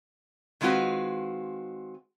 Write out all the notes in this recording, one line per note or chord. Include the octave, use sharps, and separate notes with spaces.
D#3 G#3 C4 F4 F#4 B4